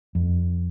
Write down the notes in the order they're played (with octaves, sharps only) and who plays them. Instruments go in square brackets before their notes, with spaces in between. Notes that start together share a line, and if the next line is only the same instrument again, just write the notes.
[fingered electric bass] F2